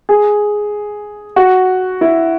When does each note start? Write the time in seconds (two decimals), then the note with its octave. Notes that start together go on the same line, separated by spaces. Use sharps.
0.09 G#4
1.36 F#4
2.01 E4